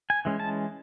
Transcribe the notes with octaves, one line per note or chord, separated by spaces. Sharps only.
G#5
E3 G#3 C#4
A5